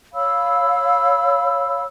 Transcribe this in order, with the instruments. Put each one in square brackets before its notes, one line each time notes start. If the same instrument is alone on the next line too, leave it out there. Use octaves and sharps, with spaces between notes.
[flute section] C#5 F5 B5 E6